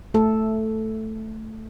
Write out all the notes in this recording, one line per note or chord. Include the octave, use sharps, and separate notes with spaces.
A3 A4